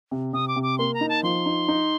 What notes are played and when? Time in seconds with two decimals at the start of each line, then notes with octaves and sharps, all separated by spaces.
0.11 C3
0.33 C3 D#6
0.48 D6
0.56 C3
0.63 D6
0.78 A#3 C6
0.94 A#5
1.01 D#4
1.09 A5
1.23 F3 C6
1.46 D#4
1.68 D#4